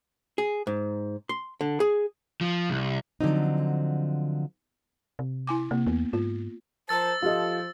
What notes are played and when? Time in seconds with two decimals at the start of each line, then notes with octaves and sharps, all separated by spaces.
0.38 G#4
0.67 G#2
1.29 C6
1.61 D3
1.80 G#4
2.41 F3
2.70 C2
3.21 D3 F3 F#3 C4 D#4
5.19 C3
5.47 E4 G#5 D6
5.71 C3 A#3
5.87 E2 B3
6.13 G#2 F4
6.89 F3 A#4 C5 A5 E6 A6
7.22 F3 F4 G4 A4 D#5